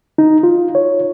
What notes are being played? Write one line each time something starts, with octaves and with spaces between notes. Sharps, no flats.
D#4
F4
C#5